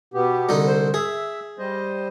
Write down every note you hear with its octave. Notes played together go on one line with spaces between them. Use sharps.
B2 B3 G4
C2 D3 D#4
C5
G#4 E5
G3 C5 D#5